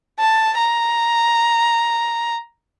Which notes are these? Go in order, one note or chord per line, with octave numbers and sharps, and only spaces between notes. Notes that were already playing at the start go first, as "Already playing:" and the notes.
A5
A#5